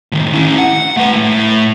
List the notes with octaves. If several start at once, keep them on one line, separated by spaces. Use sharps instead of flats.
A2 D#3
C#4 E4
F#5
A3 B4
A2